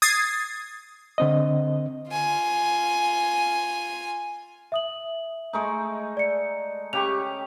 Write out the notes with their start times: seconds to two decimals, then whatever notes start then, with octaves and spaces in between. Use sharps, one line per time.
0.02 D#6 G#6 A6 C7
1.18 D3 C4 D#5
2.11 F4 G#5
4.72 E5 D#6 F#7
5.53 G#3 A3 D#4
6.17 D5 C#7
6.93 C#3 G4 C#6 F7